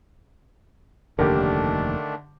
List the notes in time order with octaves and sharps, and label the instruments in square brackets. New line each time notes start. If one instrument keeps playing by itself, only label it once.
[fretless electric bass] F1 D#2 [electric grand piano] D3 [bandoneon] D#3 A3 D4 [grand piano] G4 A#4